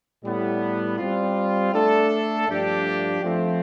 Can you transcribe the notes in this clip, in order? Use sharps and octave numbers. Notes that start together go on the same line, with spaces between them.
A2 G3 B3
G3 C4 F4
A3 D4 A4
G2 F3 A3 D4 G4
F3 A3 C4